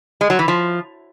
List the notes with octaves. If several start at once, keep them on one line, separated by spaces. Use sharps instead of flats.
G#3
F#3
E3
F3